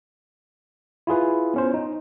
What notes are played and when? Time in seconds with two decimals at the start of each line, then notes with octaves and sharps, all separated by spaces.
1.07 E4 F4 G#4 B4
1.54 B3 C#4 C5
1.74 D#4